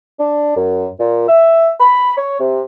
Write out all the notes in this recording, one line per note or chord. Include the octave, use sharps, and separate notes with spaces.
D4
F#2
A#2
E5
B5
C#5
C3